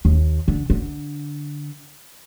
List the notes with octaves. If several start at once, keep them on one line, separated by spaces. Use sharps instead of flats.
D#2
D3
D3